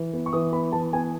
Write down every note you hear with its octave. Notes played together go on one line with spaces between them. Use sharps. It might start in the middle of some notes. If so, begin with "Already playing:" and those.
Already playing: E3
B3
C#6
E3 D#6
B3 B5
E3 A5
B3 G#5